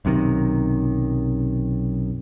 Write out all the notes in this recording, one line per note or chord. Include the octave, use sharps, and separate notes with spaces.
B1 F#2 C3 D#3